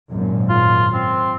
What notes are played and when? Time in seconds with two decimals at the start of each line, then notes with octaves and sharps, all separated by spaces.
0.11 G#1 F#2 A#2
0.49 F4
0.94 C4